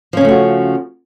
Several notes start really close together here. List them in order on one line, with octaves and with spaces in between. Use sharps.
F3 C#4 C#3 A3 F#4